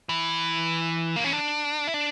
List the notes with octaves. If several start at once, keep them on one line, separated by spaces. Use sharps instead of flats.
E3
A#3
C#4
D4
E4
D4